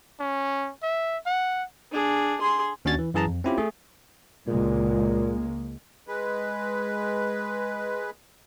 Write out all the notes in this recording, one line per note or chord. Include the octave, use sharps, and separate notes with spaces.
C#4
E5
F#5
D4 G#4
G#4 C6
D#2 C#4 D4 F#4 C#5 A6
E3
F#2 E3 G#4 A5 A#5
F2
C4 C#4 E4 F4 G4
A3 G#4
C#2 A#2 G#3 A#3
G#3 B4